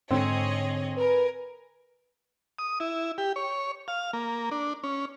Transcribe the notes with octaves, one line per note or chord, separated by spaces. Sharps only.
G#2 D3 C4 G#4 C#5 D#5
A#4 B4 G#5
D#6
E4
G4
C#5
F5
A#3
D4
C#4